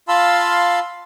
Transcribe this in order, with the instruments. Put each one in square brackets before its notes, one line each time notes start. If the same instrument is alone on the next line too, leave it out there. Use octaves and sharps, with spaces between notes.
[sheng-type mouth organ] F4 F5 A5 B5 C6 E6